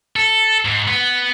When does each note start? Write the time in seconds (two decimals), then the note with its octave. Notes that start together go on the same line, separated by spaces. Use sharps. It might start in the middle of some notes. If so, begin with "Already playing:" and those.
0.16 A4
0.65 G#2
0.88 B3 B4